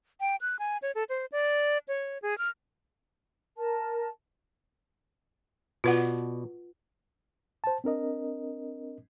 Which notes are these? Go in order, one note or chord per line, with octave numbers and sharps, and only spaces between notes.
G5
F#6
G#5
C#5
A4
C5
D5
C#5
G#4
F6
A#4 A5
B2 F4 B4 D5 F#5
C5 A5
C4 D4 A#4 D#5